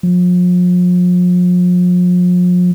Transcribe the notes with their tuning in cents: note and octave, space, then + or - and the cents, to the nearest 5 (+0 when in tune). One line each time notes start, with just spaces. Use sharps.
F3 +40